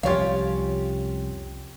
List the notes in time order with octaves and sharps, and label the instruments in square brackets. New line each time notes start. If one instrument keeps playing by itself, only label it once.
[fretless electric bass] C2 F2 C3 [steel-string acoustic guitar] C#4 G4 [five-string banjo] F4 C#5 F5